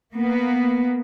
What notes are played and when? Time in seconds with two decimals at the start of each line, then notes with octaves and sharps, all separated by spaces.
0.16 A#3 B3